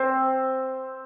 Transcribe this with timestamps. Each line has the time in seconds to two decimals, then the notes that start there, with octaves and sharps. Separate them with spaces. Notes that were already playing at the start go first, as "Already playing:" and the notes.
Already playing: C4